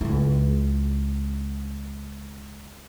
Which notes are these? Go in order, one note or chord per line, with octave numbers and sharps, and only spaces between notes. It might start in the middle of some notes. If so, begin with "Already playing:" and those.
C#2 E4